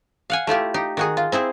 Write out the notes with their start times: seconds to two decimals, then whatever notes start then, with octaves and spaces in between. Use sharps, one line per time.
0.30 F5 F#5 G#5
0.47 A3 E4 F4 G4
0.74 D#4 G4
0.97 D#3 F#4 G#4
1.17 F4
1.32 C4 E4 G#4 C5